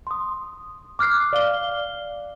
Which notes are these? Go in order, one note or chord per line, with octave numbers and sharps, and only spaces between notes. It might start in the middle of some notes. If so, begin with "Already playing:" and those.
C6 D#6
D6 F6 F#6 C7
D5 F5 G7